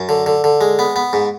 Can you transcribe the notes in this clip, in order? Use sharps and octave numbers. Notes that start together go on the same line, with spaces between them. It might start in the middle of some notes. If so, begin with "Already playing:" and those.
Already playing: F#2
D3
D3
D3
G#3
B3
B3
G#2